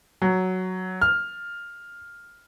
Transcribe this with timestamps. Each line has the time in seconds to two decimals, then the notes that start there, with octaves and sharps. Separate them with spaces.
0.22 F#3
1.02 F6